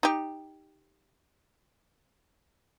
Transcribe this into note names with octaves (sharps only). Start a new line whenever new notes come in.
D#4 G4